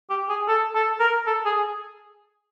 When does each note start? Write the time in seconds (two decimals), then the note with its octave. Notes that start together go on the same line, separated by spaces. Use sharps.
0.10 G4
0.29 G#4
0.48 A4
0.75 A4
1.00 A#4
1.26 A4
1.45 G#4